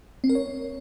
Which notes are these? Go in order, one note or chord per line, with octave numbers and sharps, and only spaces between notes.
C4
A#4
C#5